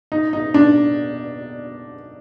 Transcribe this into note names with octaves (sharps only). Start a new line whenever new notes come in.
D#4
D#4
D4